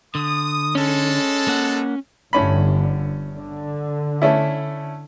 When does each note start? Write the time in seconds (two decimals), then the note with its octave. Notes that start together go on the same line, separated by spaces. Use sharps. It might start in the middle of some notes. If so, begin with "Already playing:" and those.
0.15 D3 D#6
0.75 G#3 C#4 A4
1.48 A#3 F#5
2.33 G1 A2 D3 C#4 B5
3.33 D3
4.22 A3 C#4 E4